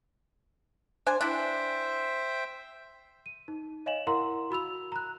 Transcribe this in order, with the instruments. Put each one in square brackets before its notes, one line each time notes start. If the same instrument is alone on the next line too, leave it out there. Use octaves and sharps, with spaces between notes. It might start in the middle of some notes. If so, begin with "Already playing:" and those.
[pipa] D4 C5 G#5
[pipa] D4 E4 [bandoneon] C5 E5 G5
[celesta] D#7
D#4
C#5 D#5 F5 G#5 E7 F#7
E4 A#4 F5 F#5 A#5 C6
F#4 B5 E6 F7
A#5 F#6